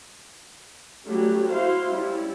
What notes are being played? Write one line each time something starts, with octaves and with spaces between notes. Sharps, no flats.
F#3 G3 A3 C#4 F#4 G4
E4 F#4 C5 F5 C6
G3 C#4 E4